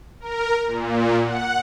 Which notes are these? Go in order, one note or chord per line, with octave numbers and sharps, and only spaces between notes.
A#4
A#2
F#5